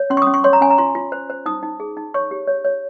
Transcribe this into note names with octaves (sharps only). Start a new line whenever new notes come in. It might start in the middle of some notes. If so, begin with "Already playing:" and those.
Already playing: C#5
C#4 C6
C#6
C#4 D#6
C#6
C#5 C6
A#5
C#4 G#5
A#5
F4 C6
F4
C5
C5
D#4 D#6
D#4
G#4
D#4
C#5 C#6
G4
C#5
C#5